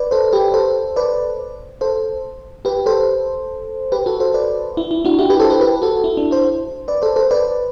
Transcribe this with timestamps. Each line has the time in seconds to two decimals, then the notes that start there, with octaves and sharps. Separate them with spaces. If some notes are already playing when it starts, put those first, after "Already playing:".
Already playing: B4 D5
0.11 A4 C5
0.33 G4 B4
0.54 A4 C5
0.96 B4 D5
1.81 A4 C5
2.65 G4 B4
2.86 A4 C5
3.92 G4 B4
4.06 F#4 A4
4.20 A4 C5
4.34 B4 D5
4.77 E4
4.91 E4
5.05 D4 F#4
5.19 E4 G4
5.30 G4 B4
5.40 A4 C5
5.50 G4 B4
5.61 G4 B4
5.82 F#4 A4
6.04 E4
6.17 D4
6.31 A4 C5
6.88 B4 D5
7.02 A4 C5
7.16 A4 C5
7.31 B4 D5